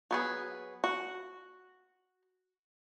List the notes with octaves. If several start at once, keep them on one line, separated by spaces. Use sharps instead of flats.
F#3 B3 G#4
F#4